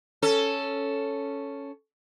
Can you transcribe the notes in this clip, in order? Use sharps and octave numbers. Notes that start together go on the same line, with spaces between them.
C#4 A4